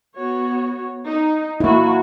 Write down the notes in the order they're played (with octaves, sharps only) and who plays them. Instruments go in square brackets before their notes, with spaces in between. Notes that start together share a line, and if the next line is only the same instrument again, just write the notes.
[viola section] B3 F#4 C#5
D#4
[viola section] F#3 F#4 [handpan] A#3 E4